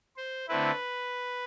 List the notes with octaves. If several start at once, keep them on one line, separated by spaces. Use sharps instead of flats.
C5
D3 A3 C4 E4 B4